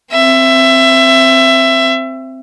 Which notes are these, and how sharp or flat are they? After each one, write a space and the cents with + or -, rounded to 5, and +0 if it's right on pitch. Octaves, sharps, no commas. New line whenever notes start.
C4 +0 E5 +20